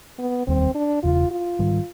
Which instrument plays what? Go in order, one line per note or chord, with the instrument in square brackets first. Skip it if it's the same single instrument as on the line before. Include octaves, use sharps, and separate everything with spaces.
[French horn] B3
[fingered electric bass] F1 D#2 D#3 G3 [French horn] C4
[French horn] D4
[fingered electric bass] E1 E2 C#3 [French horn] F4
[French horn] F4
[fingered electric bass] G#2 D#3 G3